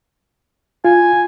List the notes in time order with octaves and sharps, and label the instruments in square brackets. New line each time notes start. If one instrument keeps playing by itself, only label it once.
[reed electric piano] F4 [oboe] G#5